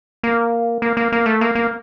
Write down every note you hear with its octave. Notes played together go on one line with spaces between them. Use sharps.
A#3
A#3
A#3
A#3
A3
A#3
A#3